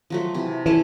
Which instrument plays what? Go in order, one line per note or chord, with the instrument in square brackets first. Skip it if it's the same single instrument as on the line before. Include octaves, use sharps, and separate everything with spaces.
[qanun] F3 F#3 A3
C3 E3
[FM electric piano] E3 [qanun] C#4 E4 A4